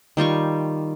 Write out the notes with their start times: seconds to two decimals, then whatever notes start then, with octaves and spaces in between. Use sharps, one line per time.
0.17 D#3 G3 F4 C#6